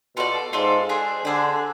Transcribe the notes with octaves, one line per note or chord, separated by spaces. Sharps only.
B2 F4 A4 D5
G#2 F4 A4 D5
D4 G#4 C5
D3 D4 G#4 C5